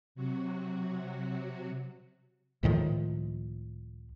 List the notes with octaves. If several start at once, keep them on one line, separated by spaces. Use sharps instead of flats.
C3 F#3 F#4
C#2 A2 D#3 F3